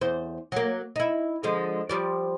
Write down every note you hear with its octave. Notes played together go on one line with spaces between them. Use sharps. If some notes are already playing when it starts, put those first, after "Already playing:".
E2 C5
F#3 A#3
D#4 E4
D3 F3 G#3
F3 G3 D5